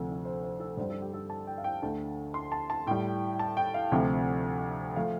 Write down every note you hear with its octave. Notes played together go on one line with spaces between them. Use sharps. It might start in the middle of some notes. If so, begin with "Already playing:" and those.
Already playing: D2 C3 F3 A4
A4
C5
C5
A4
G2 G3 C5
A4
G4
A4
A5
G5
F5
G5
D2 D3 A3 A5
C6
A5
A5
A2 G3 G5
A5
G5
F5
D2 C3 F3 A3
F3 A3 F5